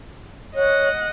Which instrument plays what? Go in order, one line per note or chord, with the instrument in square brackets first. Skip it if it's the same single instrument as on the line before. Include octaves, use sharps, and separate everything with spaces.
[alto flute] C#5 [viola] D#5 F#5